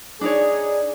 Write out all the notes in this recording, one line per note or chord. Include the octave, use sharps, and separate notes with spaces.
D4 D#4 G#4 C#5 D5